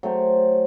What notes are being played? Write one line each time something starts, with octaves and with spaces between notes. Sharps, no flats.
F#3 A3 C4